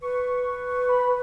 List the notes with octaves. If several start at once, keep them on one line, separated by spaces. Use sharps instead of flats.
B4 C#6
B5